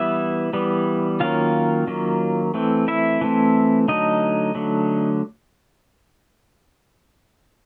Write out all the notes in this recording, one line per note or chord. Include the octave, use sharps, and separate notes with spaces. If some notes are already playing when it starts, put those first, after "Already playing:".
Already playing: E3 G3 B3 E4 E5
E3 G3 B3
D#3 F#3 A#3 C#4 F4 F5
D#3 F#3 A#3 C#4
E3 A3 C4
E4 E5
E3 A3 C4
D3 F#3 A3 D#4 D#5
D3 F#3 A3